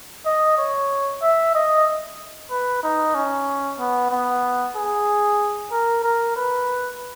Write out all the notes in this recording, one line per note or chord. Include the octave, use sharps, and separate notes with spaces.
D#5
C#5
E5
D#5
B4
D#4
C#4
B3
B3
G#4
A#4
A#4
B4